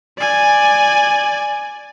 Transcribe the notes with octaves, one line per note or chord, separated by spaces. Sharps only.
D5 G#5